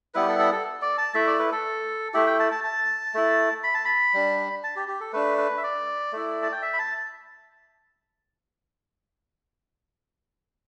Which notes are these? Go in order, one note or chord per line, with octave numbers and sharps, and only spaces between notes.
G3 B3 E4 B4
G4
A4
A4
A4
D5
A5
A3 E4 E5
D5
B4
A4
A3 E4 G4
G5
A5
A5
A5
A3 E4
B5
A5
B5
G3 D4
A5
G4
G4
A4
A3 D4 B4
B4
E5
D5
A3 E4
A5
G5
E5
B5
A5